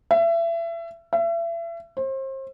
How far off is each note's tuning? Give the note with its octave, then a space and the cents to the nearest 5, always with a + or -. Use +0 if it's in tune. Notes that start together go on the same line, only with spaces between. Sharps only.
E5 +30
E5 +35
C5 +35